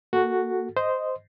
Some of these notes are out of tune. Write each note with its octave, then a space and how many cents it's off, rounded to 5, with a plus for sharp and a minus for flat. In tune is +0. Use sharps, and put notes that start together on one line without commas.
A#3 +0 F#4 +0 A4 +0
C5 -10 D#5 +0